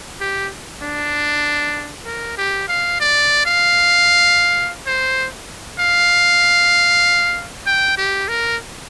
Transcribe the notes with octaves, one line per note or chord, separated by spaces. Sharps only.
G4
D4
A#4
G4
F5
D5
F5
C5
F5
G5
G4
A#4